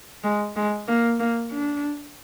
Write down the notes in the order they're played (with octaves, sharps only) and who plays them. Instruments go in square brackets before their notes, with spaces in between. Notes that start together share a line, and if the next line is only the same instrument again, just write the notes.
[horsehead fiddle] G#3
G#3
A#3
A#3
D4